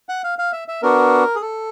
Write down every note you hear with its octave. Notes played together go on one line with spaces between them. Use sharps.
F#5
F5
F5
E5
E5
B3 D4 F#4 A#4
G#4
A4